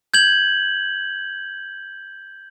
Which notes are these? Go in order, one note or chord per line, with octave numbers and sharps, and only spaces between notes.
G6 G#6 F#7